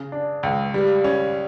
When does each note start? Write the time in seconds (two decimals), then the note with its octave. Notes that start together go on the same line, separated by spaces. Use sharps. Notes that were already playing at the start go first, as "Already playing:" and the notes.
Already playing: C#3
0.12 D4
0.43 C#2
0.74 G3
1.04 C#4